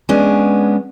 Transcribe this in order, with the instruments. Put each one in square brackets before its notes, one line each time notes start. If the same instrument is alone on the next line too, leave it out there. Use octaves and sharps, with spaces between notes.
[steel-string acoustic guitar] G#3 B3 C#4 D4